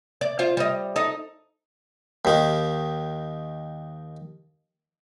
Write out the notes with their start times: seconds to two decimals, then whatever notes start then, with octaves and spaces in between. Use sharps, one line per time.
0.21 D5
0.39 F4 C5 F5
0.57 G3 D#5
0.96 D#4 A4 D#5
2.25 D#2 D#3